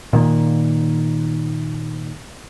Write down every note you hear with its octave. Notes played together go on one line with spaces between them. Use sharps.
A#2 D#3 A#3